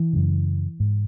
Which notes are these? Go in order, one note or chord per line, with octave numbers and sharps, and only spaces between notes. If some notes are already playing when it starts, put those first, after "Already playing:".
Already playing: E3
F#2 C#3
G#2